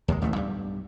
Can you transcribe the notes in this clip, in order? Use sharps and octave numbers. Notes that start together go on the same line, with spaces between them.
D#2 C3 F3 G#3
A1 D#2 G#2 A3
B1 G2 G3